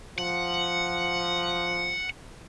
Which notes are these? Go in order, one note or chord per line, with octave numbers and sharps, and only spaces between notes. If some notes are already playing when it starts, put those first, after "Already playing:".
F3 F#5